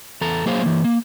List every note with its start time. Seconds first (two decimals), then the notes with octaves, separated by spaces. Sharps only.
0.21 E2 A4 A#5
0.46 F#3 A#3 G#4 C5 C#5 F5
0.62 E3 A#3
0.84 A#3